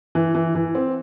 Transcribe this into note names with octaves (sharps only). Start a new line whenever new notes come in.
E3
E3
E3
C4